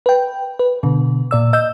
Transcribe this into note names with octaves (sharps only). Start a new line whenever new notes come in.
B4 G5
B4
B2 D3
A#2 D5 E6
D#5 E6 G6